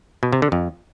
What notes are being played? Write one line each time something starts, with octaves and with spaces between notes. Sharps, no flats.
B2
C3
D3
F2